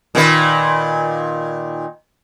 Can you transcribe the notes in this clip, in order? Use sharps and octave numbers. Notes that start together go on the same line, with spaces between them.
A#2 D#3 B4